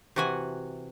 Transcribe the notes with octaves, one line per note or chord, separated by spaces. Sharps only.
C3 E3 F#4 F#5 G#5